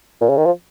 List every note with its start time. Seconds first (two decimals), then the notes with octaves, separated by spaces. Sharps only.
0.21 A#2
0.29 C#3
0.37 D#3
0.46 F3